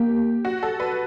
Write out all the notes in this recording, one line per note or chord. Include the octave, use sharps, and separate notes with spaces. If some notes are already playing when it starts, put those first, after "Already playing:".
Already playing: A#3 G4
F#4
A4
B4